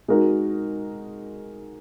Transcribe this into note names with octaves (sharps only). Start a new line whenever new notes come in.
G#3 D#4 F#4 A#4